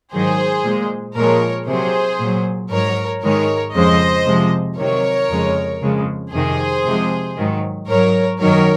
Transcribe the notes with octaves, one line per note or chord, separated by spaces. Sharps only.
G#2 D#3 F#3 G#4 C5
A#2 G#3
A#2 F3 G#3 A#4 C#5
C3 F#3 G#4 C5
A#2 F#3
G#2 F#3 A#4 C#5
G#2 D#3 G#3 A#4 C#5
F2 C#3 F3 G#3 C5 D#5
C3 F3 G#3
C3 D#3 F#3 A#4 C#5
F2 C#3 G#3
F2 C#3 F3 G#3
F2 C3 D#3 G#4 C5
C3 F3 G#3
G#2 D#3 F#3
G#2 F#3 A#4 C#5
F#2 D#3 F#3 A#4 C#5